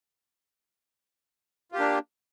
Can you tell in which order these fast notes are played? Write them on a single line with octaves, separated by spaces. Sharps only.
F4 G4 A#3 D4